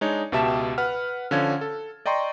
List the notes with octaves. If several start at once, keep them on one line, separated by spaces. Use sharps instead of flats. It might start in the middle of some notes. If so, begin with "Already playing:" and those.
G#3 D4 D#4 C#5
C#2 B2 G4 E5 A5 E7
B4 F#5 F6
D3 F3 C#4 F5 G#6
A4
D5 D#5 G5 A#5 C6 C#6